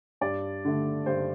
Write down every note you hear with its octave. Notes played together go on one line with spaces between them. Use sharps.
G2 D5
D3 A3
G2 C5